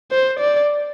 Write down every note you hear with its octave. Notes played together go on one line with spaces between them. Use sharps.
C5
D5